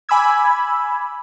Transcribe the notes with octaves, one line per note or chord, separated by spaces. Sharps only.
G#5 B5 D6 E6 G#6